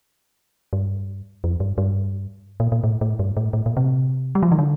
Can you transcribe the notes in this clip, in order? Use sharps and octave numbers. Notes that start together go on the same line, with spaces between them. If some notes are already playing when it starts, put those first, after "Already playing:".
G2
F2
G2
G2
A#2
A#2
A2
A2
G2
A2
A2
A#2
C3
G3
F3
D#3
D3